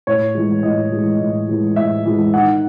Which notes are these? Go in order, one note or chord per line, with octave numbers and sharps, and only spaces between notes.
A2 C#5
E3 G#3
A2 D#5
E3 G#3
A2
E3 G#3
A2 E5
E3 G#3
D#3 F#5